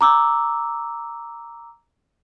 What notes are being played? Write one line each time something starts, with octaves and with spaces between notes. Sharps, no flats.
A#5 D6 E6